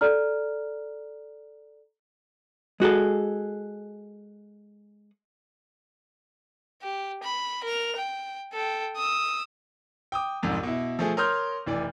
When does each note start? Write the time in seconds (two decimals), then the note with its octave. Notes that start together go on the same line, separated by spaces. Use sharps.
0.01 A4 D5 A#5 F6
2.80 G#3 F#4 G#4 A4
6.82 G4
7.23 B5
7.64 A#4 F7
7.96 G5
8.53 A4 G5
8.96 D#6 E6
10.12 G5 D6 D#6
10.43 C2 F2 G#2
10.63 B2 E4
10.99 F3 A3 G#4
11.17 A#4 C#5 C6 D#6 F6 G6
11.66 F1 E3 D5